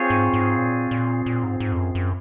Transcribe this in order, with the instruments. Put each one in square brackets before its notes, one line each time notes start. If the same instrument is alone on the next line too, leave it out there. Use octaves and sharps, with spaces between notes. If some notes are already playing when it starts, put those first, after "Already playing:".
Already playing: [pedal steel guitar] C4 F4 G#4 C#5
[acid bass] G#2
G#2
A#2
A#2
A#2
G#2
G#2
F2
F#2
F#2